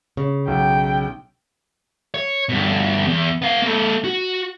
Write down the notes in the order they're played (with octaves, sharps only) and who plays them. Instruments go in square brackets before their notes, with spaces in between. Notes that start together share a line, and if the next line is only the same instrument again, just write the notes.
[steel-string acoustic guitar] C#3
[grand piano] B1 [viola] G5
[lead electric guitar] C#5
G2 B2
E2
B3 F5
A#3 A4
F#4